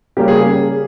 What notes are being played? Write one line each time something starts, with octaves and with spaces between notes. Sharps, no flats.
C#3 G3 A#3 C#4 G4
G#4